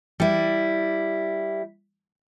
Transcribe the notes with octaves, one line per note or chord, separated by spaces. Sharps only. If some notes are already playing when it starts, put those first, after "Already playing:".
G3 E4